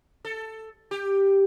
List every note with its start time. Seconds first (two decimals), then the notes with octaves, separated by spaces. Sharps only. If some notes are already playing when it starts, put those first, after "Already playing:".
0.25 A4
0.91 G4